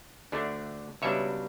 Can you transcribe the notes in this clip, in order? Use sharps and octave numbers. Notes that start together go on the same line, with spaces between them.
D2 D3 A3 D4
C#2 B2 G3 D4 C#5 E5